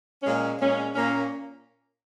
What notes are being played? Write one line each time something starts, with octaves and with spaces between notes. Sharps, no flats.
A#2 G#3 C#4
A#2 G#3 C#4
A#2 A#3 C#4